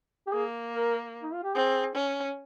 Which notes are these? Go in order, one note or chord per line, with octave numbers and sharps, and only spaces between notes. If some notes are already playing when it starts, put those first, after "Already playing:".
G4
A#3 G#4
A#4
D#4
F4
G4
C4 G#4
C#4